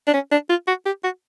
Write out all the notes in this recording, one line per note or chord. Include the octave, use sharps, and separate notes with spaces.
D4
C#4
D4
F4
F#4
G4
F#4